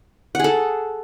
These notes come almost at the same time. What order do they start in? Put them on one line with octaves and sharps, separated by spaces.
F#5 G#4 A4